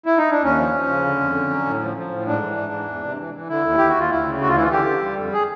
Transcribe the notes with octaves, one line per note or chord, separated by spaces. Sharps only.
E4
D#4
D4
D#2 C#4
F3
F3
C#3
D3
F2
D3
F#3
A2
F3
F3
A2
G#2 D4
E3
G#2
E3
E2
C3
E3
E3
D3 E4
D#2
D#2 G4
F#4
D#2 F4
D2 E4
C#3
D2 F#4
F4
E3 E4
F4
D3 G4
D3
G3
F2
G#4